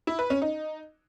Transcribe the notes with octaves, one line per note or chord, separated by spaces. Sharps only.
E4
B4
C#4
D#4